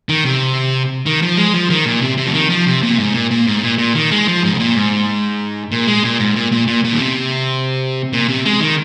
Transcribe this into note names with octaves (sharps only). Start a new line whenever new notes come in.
D#3
C3
D#3
F3
G#3
F3
D#3
A#2
C3
C3
F3
D#3
F3
C3
A#2
G#2
A#2
A#2
G#2
A#2
A#2
D#3
G#3
F3
G#2
C3
A#2
G#2
A#2
G#3
A#2
G#2
A#2
A#2
A#2
A#2
D#3
C3
A#2
C3
G#3
D#3